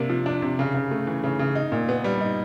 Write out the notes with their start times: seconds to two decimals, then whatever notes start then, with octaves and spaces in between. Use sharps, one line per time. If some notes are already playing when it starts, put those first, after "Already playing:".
Already playing: C3 A#3 D4
0.09 F3
0.26 D4
0.42 C3
0.59 C#3
0.74 C#3
0.91 A3
1.07 E3
1.23 C#3
1.39 C#3
1.55 D#4
1.72 A#2
1.89 B3
2.04 G3
2.21 D#4